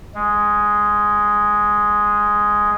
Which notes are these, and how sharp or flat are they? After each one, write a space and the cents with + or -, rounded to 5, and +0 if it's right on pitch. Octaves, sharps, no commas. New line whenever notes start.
G#3 +0